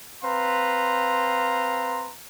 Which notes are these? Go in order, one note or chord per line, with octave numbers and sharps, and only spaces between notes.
C4 B4 F5 A#5 C6